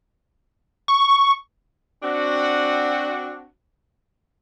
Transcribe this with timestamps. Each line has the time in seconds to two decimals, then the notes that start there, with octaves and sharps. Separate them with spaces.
0.88 C#6
2.03 C4 D4 F#4